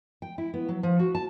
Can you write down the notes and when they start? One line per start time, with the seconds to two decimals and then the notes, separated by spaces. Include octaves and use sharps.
0.22 G5
0.38 E4
0.54 B3
0.69 F#3
0.83 F3
0.99 F#4
1.15 A5